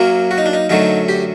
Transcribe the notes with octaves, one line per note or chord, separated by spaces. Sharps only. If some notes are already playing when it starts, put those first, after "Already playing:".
Already playing: F#2 F#3 A#3
F#4
D#4
D4
D#4
F#2 D3 F#3 A3 D#4
G4